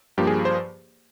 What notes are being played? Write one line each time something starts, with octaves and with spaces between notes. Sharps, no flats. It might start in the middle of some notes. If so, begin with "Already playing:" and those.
G2 F3 A#3 G4
G#4
C5